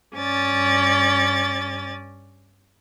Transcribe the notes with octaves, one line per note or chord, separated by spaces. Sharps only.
G2 C#4 D5 A6